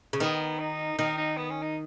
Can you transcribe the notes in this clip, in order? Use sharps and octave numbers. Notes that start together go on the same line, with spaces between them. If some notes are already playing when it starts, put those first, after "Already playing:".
C#3
D#3 B3
D#4
D#3 D#4
D#4
B3
C#4
D#4